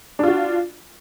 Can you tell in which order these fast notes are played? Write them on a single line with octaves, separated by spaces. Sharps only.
D4 F4 F#4